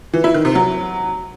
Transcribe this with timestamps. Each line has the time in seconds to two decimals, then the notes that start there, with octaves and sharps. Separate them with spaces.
0.14 E3
0.24 E4
0.34 D#3
0.45 C3
0.55 F#3